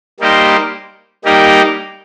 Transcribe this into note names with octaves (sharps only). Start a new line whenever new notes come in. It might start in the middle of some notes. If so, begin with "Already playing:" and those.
G3 A#3 D#4 G4 C5
G3 A#3 D#4 G4 A#4